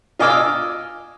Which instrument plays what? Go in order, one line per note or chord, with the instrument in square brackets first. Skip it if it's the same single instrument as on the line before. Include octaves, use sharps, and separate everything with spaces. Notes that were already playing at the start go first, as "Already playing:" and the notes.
[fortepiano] F4 D#5 G#5 D6 E6 F6